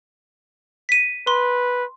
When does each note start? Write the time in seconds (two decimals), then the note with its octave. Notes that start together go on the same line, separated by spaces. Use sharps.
0.89 B6 D#7
1.27 B4 C6